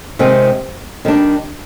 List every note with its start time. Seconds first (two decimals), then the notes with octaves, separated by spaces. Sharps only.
0.19 C3 D#3 G#3 C4
1.05 D#3 G3 D4